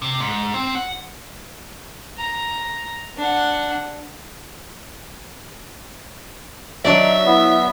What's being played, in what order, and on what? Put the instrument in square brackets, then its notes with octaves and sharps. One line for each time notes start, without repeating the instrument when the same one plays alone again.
[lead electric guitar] C3
G#2
C4
F#5
[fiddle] A#5
D4 F#5
[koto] F#3 D4 D5 [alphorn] D#4 [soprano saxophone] E5
[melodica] B3 [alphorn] E4